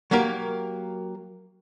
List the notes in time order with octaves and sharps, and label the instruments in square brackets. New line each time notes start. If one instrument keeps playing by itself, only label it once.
[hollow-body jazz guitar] F#3 A#3 G4 A#4